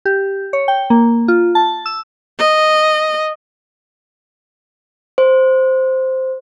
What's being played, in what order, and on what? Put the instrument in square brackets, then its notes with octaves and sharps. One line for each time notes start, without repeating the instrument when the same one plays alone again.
[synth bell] G4
C#5
G5
A#3
F4
A5
E6
[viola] D#5
[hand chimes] C5